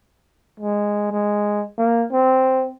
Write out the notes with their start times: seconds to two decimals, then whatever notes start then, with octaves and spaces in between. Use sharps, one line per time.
0.60 G#3
1.12 G#3
1.78 A#3
2.12 C4